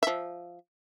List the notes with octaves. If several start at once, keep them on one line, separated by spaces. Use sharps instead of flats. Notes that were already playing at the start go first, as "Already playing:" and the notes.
F3 E5